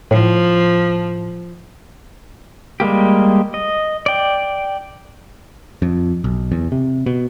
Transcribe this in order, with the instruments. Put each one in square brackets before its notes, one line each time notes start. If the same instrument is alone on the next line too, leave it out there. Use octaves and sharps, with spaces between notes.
[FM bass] A2 [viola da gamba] F3
[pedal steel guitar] G3 G#3 A#3 G4
D#5
D5 G5
[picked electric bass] F2
B1
E2
C3
B2